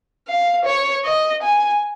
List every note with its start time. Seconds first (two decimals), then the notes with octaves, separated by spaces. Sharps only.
0.28 F5
0.65 C#5
1.04 D#5
1.43 G#5